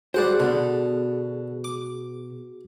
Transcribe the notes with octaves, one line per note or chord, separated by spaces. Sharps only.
G3 F#4 G#4 C5 D5 F#5 G5
B2 D3 B3
D6